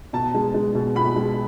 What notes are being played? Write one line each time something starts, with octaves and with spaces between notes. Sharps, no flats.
B2 A5
G#3
G#3
B2
B2 B5
G#3